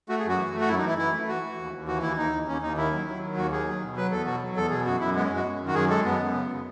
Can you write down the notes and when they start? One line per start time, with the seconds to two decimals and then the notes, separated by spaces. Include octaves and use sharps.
0.09 A3 F#4
0.20 G#4
0.24 F#2
0.29 F#4
0.38 E3
0.53 A3
0.60 F#4
0.68 F#2 E4
0.78 D#4
0.83 E3 E4
0.98 E3 E4
1.13 A3
1.28 E3 F#4
1.43 E3
1.58 D#2
1.73 D#2
1.87 E3 F#4
2.02 D#2 E4
2.17 D#2 D#4
2.33 D#2
2.47 D#2 C#4
2.62 D#2 D#4
2.77 D#3 E4
2.93 F#3
3.06 F#3
3.21 D#3
3.36 D#2 F#4
3.51 D#3 G#4
3.66 F#3
3.82 B2
3.97 F#3 B4
4.11 E2 A4
4.25 B2 F#4
4.42 F#3
4.56 E2 A4
4.70 B2 G#4
4.85 F#2 F#4
5.00 F#2 E4
5.15 G#3 B3
5.25 C#4
5.30 F#2
5.36 F#4
5.46 F#2
5.60 D#3
5.67 F#4
5.74 F#2 G#4
5.90 G#3 A4
6.05 F#2 B3
6.20 F#2
6.34 C#3
6.50 C#3